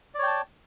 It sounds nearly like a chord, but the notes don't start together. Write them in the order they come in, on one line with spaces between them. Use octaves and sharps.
D5 C#5 G5 A5